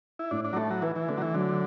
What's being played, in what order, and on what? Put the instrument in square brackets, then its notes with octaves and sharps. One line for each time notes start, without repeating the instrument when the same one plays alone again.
[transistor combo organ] E4
[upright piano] A2 [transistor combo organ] D4
[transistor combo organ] D4
F#3
[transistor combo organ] A3 [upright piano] E4
[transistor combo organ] F#3
[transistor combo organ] E3 [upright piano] B4
[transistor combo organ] E3
[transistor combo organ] D3 [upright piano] A3
[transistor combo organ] F#3
E3
[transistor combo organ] D3 [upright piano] F#3